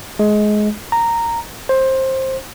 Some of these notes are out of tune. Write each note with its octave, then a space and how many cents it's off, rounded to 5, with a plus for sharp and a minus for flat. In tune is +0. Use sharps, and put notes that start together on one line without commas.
G#3 +20
A#5 -10
C5 +15